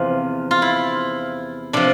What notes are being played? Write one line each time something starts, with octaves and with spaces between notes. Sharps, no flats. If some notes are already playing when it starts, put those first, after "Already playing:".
Already playing: E2 C3 F3 F4
F4
E4
C3 F3 D4